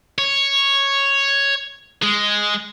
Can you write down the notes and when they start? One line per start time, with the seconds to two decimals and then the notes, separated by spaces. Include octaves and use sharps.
0.18 C#5
2.03 G#3